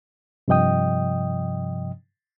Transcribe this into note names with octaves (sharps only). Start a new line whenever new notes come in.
G2 C3 F3 D#5 G5 D#6